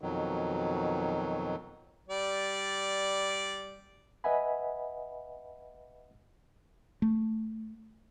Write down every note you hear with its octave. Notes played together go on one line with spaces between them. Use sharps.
F2 B2 D#3 F#3
G3 D5
B4 D#5 E5 F#5 G#5 B5
A3